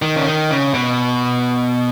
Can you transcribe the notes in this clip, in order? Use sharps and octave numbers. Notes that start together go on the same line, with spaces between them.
D#3
C#3
D#3
C#3
B2